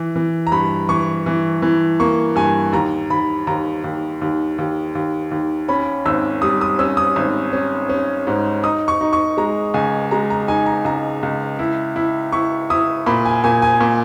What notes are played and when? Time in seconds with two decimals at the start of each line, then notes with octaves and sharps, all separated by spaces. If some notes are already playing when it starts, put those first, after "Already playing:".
Already playing: E3
0.15 E3
0.47 A#5
0.52 G2 B5
0.89 E3 C#6
1.26 E3
1.62 E3
2.00 A#3 C#6
2.36 G2 G#5
2.73 D#2 A#5
3.10 D#2 B5
3.47 D#2 A#5
3.84 D#2
4.21 D#2
4.58 D#2
4.95 D#2
5.31 D#2
5.68 C#4 B5
6.06 G#1 E6
6.42 G3 D#6
6.61 D#6
6.79 C#4 E6
6.97 D#6
7.16 G#1
7.53 C#4
7.89 C#4
8.27 G#2
8.63 D#4 D#6
8.88 C#6
9.01 D#4
9.13 C#6
9.37 G#3 A#5
9.74 C#2 G#5
10.11 G#3 A#5
10.30 A#5
10.48 D#4 G#5
10.66 A#5
10.85 C#2 A#5
11.23 C#2
11.59 E4
11.96 E4
12.32 E4 C#6
12.70 E4 D#6
13.07 A#2 B5
13.25 G#5
13.44 A#2 G#5
13.62 G#5
13.81 A#2